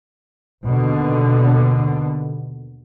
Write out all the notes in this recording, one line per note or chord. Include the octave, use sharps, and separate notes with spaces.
D#2 B2 D3